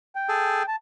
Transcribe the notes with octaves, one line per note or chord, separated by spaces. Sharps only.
G5
G#4 A4
A5